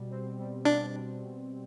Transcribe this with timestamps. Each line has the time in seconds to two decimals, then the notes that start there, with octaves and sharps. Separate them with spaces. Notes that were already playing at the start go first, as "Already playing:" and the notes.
Already playing: B2 G3
0.10 C4
0.38 G3
0.65 B2 D4
0.94 G3
1.22 B2